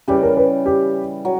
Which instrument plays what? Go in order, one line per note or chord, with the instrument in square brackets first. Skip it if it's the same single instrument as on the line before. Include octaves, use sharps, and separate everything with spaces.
[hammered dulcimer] C#3 E3 G3 [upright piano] G4
[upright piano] A#4
B4
G4
[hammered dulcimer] F#3